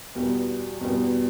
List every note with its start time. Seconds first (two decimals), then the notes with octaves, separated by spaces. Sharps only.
0.15 E2 B2 G3 B3
0.81 E2 B2 G3 B3